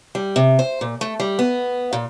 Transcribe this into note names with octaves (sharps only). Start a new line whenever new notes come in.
G3
C3
C5
A#2
A3
G3
B3
A#2